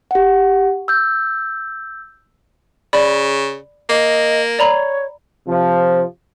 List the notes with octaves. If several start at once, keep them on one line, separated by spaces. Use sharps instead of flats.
G4 F#5
E6 G6
C#3 D5 B5
A#3 D#5
C#5 D5 A#5 B5
C3 F3